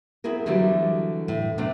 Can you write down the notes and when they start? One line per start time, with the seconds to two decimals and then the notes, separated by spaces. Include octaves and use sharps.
0.24 B3 C4 E4 G#4 A#4
0.46 D3 E3 F#3 G3 A3 G4
1.28 A2
1.58 C3 A3 B3 D4